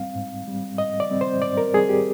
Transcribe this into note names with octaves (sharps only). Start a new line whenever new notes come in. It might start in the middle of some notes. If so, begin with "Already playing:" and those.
Already playing: G#2 G3 C4 F5
G#2
G3 C4
G#2 D#5
D5
G3 C4
C5
G#2 D5
A#4
G3 C4 G#4
G4